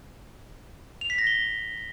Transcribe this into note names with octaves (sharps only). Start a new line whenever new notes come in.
F7
B6
A#6
G7